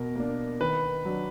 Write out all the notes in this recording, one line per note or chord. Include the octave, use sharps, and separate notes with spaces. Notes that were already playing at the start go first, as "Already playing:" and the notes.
Already playing: B2 A#4
A#3 D4
D#3 B4
F#3 D4